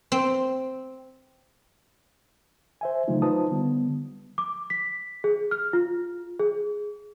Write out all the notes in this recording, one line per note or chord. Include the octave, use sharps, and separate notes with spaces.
C4
C5 E5 G#5
C#3 E3 F#3 A3 D#4 F4
D#4 F4 B4 C5 A5 D#6
D3 G3 B3
D6
B6
G#4
F6
F4
G#4